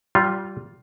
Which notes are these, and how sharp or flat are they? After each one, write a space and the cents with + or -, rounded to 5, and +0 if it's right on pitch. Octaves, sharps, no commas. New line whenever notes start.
G3 -20 F4 +5